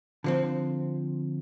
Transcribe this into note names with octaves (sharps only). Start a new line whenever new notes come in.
D3 F3 C4